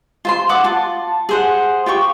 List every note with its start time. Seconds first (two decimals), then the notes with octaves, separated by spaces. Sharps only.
0.25 F4 C5 C6
0.49 F#5 D6
0.64 F4 A5
1.29 G#4 C5 F#5
1.86 F4 G4 G5 C#6